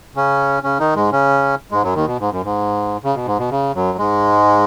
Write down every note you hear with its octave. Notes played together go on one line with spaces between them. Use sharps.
C#3 C#4
C#3 C#4
D#3 D#4
G#2 G#3
C#3 C#4
G#2 G#3
F#2 F#3
D#2 D#3
B2
G#2
F#2
G#2
C#3
B2
G#2
B2
C#3
F#2 F#3
G#2 G#3